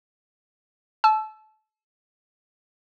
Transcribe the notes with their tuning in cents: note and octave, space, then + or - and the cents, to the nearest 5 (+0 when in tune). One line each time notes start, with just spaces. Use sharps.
A5 -30 E6 +10